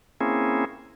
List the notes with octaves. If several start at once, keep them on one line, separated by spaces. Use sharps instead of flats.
A#3 C4 C#4 E4 G#4